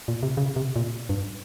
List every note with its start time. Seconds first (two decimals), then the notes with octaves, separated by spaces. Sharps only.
0.08 A#2
0.23 C3
0.37 C#3
0.56 C3
0.76 A#2
1.09 G2